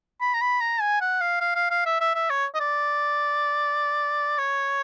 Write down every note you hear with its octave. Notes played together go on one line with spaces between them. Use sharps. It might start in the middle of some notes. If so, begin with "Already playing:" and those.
B5
A#5
B5
A#5
G#5
F#5
F5
F5
F5
F5
E5
E5
E5
C#5
D#5
D5
C#5